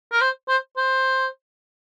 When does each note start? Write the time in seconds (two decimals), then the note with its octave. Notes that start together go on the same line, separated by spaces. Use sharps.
0.12 A#4
0.21 C5
0.49 C5
0.77 C5